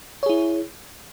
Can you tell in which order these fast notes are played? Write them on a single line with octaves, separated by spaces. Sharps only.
C#5 G#4 E4